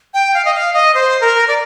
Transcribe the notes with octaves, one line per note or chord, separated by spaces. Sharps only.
G5
F5
D#5
F5
D#5
C5
A#4
D5